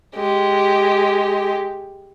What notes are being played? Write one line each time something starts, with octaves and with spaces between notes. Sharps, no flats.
G#3 G4